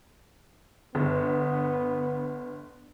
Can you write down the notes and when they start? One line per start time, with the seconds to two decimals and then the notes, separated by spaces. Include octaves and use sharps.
0.95 G1 B3